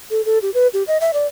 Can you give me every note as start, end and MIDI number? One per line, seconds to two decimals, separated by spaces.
0.11 0.24 69
0.25 0.39 69
0.42 0.50 67
0.54 0.67 71
0.74 0.83 67
0.88 0.98 75
1.01 1.11 76
1.13 1.27 74